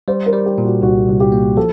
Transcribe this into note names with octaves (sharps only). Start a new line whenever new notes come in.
G3 C5
A#4
G3
G4
A#2
F#4
C2 F#4
C2
G4
A#3
F3 A4